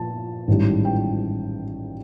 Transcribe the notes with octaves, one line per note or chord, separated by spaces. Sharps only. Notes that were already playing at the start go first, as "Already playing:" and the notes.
Already playing: A#2 F3 A5
A1 G#2 D#3 G3
G5